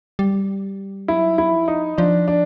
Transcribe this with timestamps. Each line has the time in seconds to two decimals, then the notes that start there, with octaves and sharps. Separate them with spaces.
0.19 G3
1.08 F#3 E4
1.38 E4
1.52 F3
1.68 D#4
1.98 F3 D4
2.28 D4